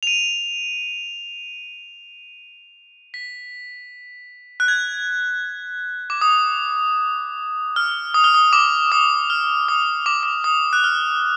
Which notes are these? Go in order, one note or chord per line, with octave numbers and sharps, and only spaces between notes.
F7
D#7
B6
F#6
G#6
D6
D#6
F6
D#6
F6
D#6
D6
D#6
F6
D#6
D6
D6
D#6
F#6
F6